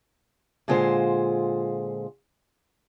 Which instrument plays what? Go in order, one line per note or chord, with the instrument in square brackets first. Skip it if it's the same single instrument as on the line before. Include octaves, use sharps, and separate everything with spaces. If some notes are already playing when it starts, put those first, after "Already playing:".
[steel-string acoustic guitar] A#2 D3 G#3 F4 C5